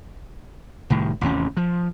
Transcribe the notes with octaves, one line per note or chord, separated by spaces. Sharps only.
C2 A2 D#3
A1 D#2 C3 C#4
F3